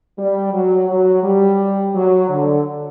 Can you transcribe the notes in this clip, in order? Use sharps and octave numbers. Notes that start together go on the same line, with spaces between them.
G3
F#3
F#3
G3
F#3
D3